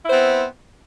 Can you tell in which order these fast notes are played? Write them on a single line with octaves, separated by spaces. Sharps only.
E4 C5 B3 C4